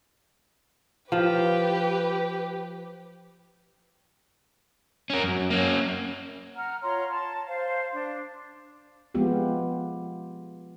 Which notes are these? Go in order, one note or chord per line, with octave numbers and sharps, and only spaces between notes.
F3 G4 B4
C#4 A#4
F#2
A#3 C#4
F#5 A#5 F6
F4 C#5 A#5 C6
A5
C5 F5
D4
F3 G#3 B3 F4 G4